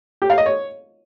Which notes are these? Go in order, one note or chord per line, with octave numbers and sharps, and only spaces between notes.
G4
F5
D#5
C#5